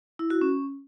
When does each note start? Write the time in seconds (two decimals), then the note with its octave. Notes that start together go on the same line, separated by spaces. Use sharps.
0.19 E4
0.30 F#4
0.41 C#4